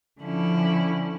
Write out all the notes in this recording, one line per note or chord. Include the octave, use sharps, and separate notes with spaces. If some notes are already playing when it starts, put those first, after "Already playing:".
D3 F3 C#4 E4